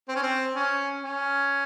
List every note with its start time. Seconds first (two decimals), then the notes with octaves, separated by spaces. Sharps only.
0.09 C4
0.15 C#4
0.23 C4
0.56 C#4
1.03 C#4